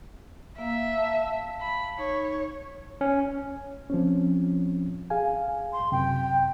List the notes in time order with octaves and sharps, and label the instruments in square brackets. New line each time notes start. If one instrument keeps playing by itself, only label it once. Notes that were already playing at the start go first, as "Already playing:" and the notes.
[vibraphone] A#3 F5 A#5 [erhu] E5
[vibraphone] F5 A5
[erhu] B5
[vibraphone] D#4 [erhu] C#5
[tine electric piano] C#4
[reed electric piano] F3 C4 C#4
G#4 F5 G#5
[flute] C6
[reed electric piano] F#2 C3 [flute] G5